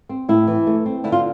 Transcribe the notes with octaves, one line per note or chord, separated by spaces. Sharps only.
C4
A2 E4
E3
A3
C4
D3 E4
F4